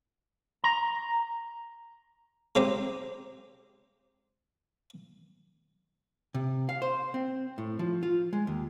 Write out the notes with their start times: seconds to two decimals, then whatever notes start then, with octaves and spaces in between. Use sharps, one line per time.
0.64 A#5
2.55 C#3 G#3 C4 D#4 G4
6.34 C3
6.69 F5
6.82 C5
7.14 C4
7.58 A2
7.79 F3
8.03 F4
8.33 G#3
8.47 D#2